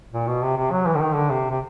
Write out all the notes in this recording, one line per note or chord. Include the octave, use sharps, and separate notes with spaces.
A#2
B2
C3
C3
F#3
E3
D3
D#3
D3
C3
C3